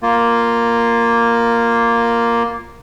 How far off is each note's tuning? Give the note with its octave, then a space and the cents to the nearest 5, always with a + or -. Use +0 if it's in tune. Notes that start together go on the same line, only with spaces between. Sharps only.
A#3 +0 F4 +0